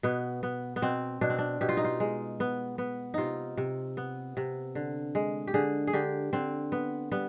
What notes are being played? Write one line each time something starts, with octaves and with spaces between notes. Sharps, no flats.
B2 B3
B3
B3
B2 C4
B2 D4
C4
D4
B2 G4
F4
D#4
F4
G#3
B3
B3
C3 D#4 F4
C3
B3
C3
D3
G#3
G4
D3 G#4
G#4
D3 G4
D3 C4
B3
G3 B3